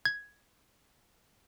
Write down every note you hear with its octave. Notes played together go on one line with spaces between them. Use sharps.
G#6